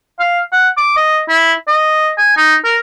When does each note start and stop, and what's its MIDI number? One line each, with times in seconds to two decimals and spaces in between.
0.19 0.40 77
0.52 0.69 78
0.77 0.92 86
0.96 1.21 75
1.28 1.53 64
1.68 2.10 75
2.18 2.34 80
2.37 2.55 63
2.64 2.76 70